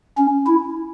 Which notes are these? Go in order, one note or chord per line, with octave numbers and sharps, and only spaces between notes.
C#4
E4